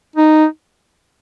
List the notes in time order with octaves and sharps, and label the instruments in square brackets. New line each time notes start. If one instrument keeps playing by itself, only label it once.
[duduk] D#4